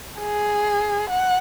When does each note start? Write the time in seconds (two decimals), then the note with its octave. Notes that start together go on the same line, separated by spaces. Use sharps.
0.20 G#4
1.10 F#5